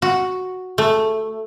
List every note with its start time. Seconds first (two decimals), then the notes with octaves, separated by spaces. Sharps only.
0.02 F#4
0.78 A3